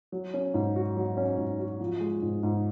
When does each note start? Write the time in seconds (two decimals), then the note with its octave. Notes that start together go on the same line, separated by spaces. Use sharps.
0.12 F#3
0.34 C#4
0.54 G#2
0.76 F#4
0.97 F#3
1.17 C#4
1.37 G#2
1.59 F#4
1.80 F3
2.00 G#3
2.22 G#2
2.43 G#2